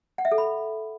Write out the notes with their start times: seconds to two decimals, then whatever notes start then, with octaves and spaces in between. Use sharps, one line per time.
0.18 F#5
0.25 E5
0.31 A4
0.38 B5